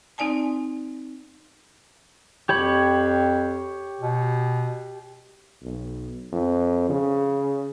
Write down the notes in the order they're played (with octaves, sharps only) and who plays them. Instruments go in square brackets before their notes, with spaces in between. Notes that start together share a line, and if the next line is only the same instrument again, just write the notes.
[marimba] C4 D#4 D5 G#5 A5
[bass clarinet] F2 [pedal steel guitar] G4 C#5 B5
[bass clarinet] B2
[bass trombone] B1
F2
C#3